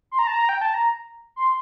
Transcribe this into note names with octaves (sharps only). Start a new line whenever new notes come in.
C6
A#5
A5
A#5
G5
A5
A#5
C6